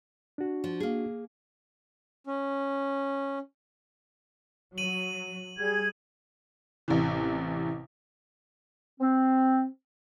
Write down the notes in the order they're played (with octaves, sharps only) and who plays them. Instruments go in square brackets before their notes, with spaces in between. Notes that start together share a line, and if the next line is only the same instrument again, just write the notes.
[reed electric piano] D4 F#4
[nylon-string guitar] F3
A#3 G#4
[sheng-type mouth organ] C#4
[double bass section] F#3 [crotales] D#7 F#7
[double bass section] G3 [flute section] G#4 G#6
[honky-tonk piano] A1 C3 E3
[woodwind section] C4